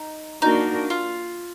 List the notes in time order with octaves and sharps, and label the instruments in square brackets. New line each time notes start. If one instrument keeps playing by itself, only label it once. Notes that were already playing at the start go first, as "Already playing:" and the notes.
Already playing: [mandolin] D#4
[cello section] A#3 D4 F#4 A#4 [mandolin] D#4
[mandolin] F4